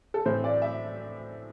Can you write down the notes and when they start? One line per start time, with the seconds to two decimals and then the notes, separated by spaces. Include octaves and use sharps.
0.14 A4
0.25 A2 E3 C4 C5
0.44 D5
0.62 E5